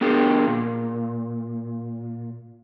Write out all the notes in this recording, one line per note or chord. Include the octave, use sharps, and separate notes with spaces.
B3 D4 G4 G#4 A#4
A#2